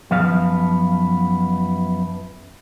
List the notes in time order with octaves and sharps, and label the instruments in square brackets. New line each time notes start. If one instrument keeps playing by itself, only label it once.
[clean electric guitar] F#2 F3 B3 F5